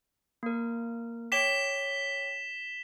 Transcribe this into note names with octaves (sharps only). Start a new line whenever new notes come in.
A#3 A#4
C#5 G5 D6 B6 E7 G7